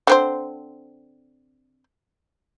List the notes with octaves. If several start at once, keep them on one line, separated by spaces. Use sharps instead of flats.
D3 C4 C5